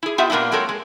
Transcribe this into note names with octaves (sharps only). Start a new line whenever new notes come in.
E4 G#4
B3 F4 G4 D#5 E5 F#5
A#2 A#3 B3 D4 E4
F#3 G#3 C4 A4 A#4 C#5
G#3